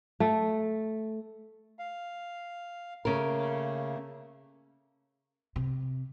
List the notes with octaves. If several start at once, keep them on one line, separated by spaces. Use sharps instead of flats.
A3
F5
C#3 A3 A#3 A#4
C3